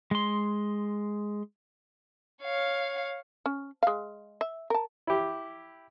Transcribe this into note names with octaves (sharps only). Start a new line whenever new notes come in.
G#3 C6
C#5 F5
C#4
G#3 F5
E5
A#4 A5
E4 G4